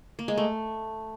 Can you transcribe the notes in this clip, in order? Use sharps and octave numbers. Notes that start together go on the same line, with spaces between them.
A#3
G#3
A3